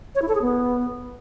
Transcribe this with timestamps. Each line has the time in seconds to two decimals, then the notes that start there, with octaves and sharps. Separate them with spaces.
0.15 C#5
0.22 E4
0.28 A4
0.35 G#4
0.42 B3